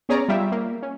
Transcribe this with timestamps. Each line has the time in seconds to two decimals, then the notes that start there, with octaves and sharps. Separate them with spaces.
0.09 B3 C#4 G#4 C#5 D5 A#5
0.28 G3 F4 G4 E5
0.52 A#3
0.82 C#4